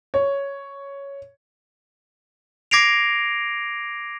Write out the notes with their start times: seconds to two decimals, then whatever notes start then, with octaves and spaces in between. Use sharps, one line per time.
0.14 C#5
2.71 D6 G#6 A#6 C7 D7 F7